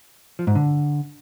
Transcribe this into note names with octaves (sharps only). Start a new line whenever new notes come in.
F3
G#2
D3